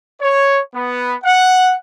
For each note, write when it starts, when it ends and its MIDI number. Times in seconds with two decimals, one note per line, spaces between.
0.21 0.60 73
0.75 1.15 59
1.24 1.75 78